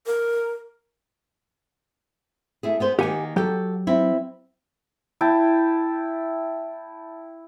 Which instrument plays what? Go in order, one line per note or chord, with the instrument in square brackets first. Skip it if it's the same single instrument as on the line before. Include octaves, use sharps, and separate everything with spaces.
[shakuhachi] A#4
[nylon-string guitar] A3 E4 G#4
B3 G#4 C5
[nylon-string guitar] D#3 A#3 [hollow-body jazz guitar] G4 F#5 G#5
[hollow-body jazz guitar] F#3 G4 [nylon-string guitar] F#4 A4
[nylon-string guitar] B3 C4 E4
[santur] E4 G5 A5